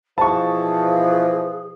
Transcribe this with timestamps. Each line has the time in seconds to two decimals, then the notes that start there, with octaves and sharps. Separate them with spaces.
0.18 B2 E3 F3 G#4 A5 C#6